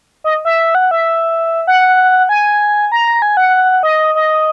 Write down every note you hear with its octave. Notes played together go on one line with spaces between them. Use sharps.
D#5
E5
F#5
E5
F#5
G#5
A#5
G#5
F#5
D#5
D#5